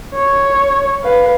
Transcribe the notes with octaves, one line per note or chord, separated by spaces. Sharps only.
C#5
B4 F5